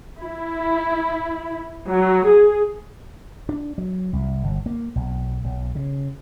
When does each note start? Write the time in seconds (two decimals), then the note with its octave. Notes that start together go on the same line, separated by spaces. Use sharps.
0.21 E4
1.88 F#3
2.26 G#4
3.49 D4
3.78 F#3
4.13 C2
4.44 G1
4.66 A#3
4.96 B1
5.44 B1
5.75 C#3